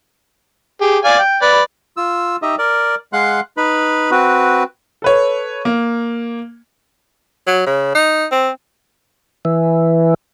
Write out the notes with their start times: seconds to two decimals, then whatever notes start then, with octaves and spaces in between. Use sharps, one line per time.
0.81 G4 G#4
1.05 D5 F5 G#5
1.19 G5
1.42 B4 D5
1.97 F4 E6
2.42 D#4 G4 D#5 E5
2.58 A#4 D5
3.13 G#3 F5 F#5 C6 F#6
3.57 D#4 B4 B5
4.11 C4 F#4 B4
5.02 A4 B4 C#5
5.65 A#3
7.47 F#3
7.66 C#3
7.95 D#4
8.32 C4
9.45 E3